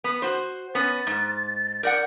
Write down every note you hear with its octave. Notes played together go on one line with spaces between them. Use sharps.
B3
F#4 C5
B3 C#4 A6
G#2
A#4 D5 F#5 G6